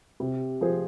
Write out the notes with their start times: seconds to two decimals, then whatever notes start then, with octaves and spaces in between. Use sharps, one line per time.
0.20 C3
0.61 F3 C4 G#4 C5